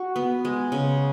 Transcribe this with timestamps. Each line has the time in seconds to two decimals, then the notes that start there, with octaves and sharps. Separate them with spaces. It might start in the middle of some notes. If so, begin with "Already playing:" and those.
Already playing: F#4
0.16 B3
0.45 G#3
0.72 C#3